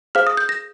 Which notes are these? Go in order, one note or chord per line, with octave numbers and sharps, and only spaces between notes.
G#4 C5 F5 F6
D#6
G6
A#6